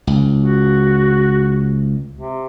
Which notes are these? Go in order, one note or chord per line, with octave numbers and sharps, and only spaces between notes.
C#2
F#4
C3